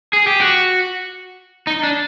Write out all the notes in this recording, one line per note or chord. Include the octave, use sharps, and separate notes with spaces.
G#4
G4
F#4
D#4
D4